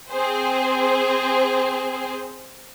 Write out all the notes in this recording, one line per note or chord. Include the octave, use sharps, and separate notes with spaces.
C4 G#4 C5